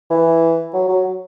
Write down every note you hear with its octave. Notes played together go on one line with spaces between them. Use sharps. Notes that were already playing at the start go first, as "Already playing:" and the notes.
E3
F#3
F#3